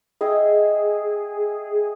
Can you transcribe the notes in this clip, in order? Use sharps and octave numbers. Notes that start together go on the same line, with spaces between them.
G#4 D#5 E5 G5